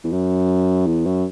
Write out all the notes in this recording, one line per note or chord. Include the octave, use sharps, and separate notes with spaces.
E2
F#2
E2
F#2